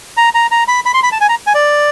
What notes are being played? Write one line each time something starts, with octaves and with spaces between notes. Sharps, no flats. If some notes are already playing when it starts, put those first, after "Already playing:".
A#5
A#5
A#5
B5
B5
C6
B5
A5
G#5
A#5
G#5
D5